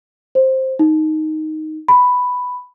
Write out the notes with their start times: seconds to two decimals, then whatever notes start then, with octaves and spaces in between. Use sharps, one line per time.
0.35 C5
0.79 D#4
1.88 B5